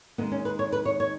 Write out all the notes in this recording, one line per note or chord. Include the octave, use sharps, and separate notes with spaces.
D#2 D#3 G#3 B3
C#4
B4
C#5
B4
C#5
C#5